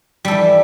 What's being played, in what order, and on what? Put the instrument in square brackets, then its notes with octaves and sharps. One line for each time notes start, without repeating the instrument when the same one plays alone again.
[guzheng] G3
A4
E3